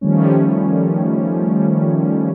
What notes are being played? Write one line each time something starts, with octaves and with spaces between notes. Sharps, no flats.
D#3 F3 G3 A3 C#4